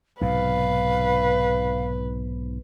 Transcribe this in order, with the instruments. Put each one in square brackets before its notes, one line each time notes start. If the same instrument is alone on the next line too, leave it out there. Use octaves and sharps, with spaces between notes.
[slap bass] B1 G#2 C3 [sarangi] B4 [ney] F5